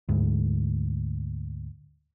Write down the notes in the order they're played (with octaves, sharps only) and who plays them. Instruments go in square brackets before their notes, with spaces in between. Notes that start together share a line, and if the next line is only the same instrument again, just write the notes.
[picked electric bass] D2 G#2